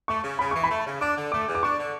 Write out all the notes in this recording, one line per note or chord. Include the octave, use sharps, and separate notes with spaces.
A3 C#6
C#3
C#3 B5
E3 C#6
B5
A3
C#3
D4 D6
D3
A3 D6
E2
D6
D4 C#6
D3